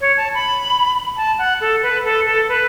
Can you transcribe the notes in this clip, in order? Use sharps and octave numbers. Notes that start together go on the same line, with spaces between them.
C#5
A5
B5
A5
F#5
A4
B4
A4
A4
B4